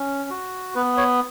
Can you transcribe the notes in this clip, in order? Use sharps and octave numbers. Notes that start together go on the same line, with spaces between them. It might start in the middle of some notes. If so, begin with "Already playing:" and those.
Already playing: C#4
F#4
B3 B4
C#5